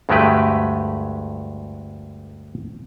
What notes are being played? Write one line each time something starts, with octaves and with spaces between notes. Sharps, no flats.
D2 G2 G#3 A3 G4 B4